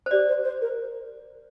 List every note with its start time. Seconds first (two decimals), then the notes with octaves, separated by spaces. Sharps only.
0.06 C5
0.11 G4 D5
0.29 C5
0.44 C5
0.61 A#4